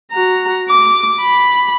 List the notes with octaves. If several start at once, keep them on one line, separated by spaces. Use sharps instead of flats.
F#4 A#5
D6
B5